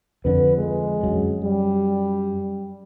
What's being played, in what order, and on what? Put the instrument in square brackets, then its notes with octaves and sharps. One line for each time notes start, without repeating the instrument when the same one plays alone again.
[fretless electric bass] F2 D3 [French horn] B4
[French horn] G#3
[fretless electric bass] F#2 F#3
[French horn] G3